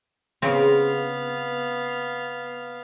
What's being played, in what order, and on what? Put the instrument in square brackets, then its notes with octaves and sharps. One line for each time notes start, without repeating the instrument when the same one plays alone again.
[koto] C#3 C4 [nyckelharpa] B3 F5